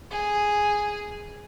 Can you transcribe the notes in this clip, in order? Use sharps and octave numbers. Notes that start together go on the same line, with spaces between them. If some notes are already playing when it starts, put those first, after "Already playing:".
G#4